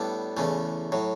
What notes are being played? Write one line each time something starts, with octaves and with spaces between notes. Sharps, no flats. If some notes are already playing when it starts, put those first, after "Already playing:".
Already playing: A2 G3 B3 D4 A4
E2 C#3 E3 A3
A2 F#3